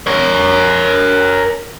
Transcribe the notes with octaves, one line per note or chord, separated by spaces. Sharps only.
A#4 C#5